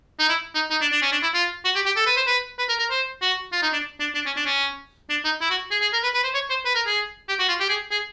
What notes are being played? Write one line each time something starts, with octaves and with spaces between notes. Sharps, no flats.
D#4
E4
D#4
D#4
D4
D4
C#4
D4
E4
F4
F#4
G4
G4
A4
B4
C5
B4
B4
A#4
A#4
C5
F#4
F4
D#4
D4
D4
D4
C#4
D4
C#4
D4
D#4
E4
F#4
G#4
G#4
A#4
B4
B4
C5
C#5
C5
B4
A#4
G#4
G4
F#4
F4
G4
G#4
G#4